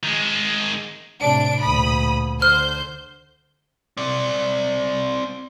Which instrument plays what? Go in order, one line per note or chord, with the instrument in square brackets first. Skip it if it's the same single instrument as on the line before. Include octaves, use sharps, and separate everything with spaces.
[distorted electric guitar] D#3 G#3
[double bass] A2 C3 [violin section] D4 D7
[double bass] D2 A#2 [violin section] B5 D#6
[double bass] D3 [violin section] C5 G6 [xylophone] F6
[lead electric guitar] C4 D5